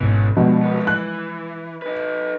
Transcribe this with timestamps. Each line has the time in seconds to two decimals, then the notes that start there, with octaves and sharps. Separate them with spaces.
0.01 G#1 G#2 B2 E3 C#4
0.37 G2 B2 F3 G#3
0.61 C2 B3
0.87 E3 F#6
1.82 D#4 B4